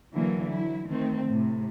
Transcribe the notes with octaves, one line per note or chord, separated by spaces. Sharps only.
D3 E3 F#3 A#3
F#3 E4
D#3 A3 C4
A2 C3